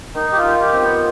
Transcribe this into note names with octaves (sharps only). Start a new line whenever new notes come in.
D#3 D#4
G4
F4
D#3
G4
C4 F4
B3